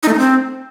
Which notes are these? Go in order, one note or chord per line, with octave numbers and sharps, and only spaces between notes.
D#4
A3
D#4
C4